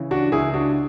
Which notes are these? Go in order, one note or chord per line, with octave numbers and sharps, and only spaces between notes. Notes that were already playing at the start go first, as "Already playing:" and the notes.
Already playing: C#3 E3
D4 F#4
C#2 E4 G#4
D4 F#4